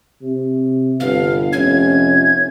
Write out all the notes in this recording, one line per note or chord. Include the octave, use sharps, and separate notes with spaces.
C3
G1 B3 F5
F1 C#4 G#6